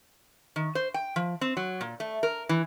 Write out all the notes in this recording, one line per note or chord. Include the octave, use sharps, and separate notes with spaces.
D#3
C5
G5
F3
C4
F#3
A#2
A3
A#4
E3